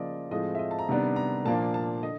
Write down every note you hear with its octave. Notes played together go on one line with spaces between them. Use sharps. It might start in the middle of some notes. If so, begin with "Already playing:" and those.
Already playing: C#3 F3 A#3 D5 D#5
A2 F3 G#3 C4 D#5
E5
D#5
A5
A#5
C3 D#3 G3 B3 D4 A#5
A#5
A#2 F3 A#3 D4 A5
A5
D3 D#5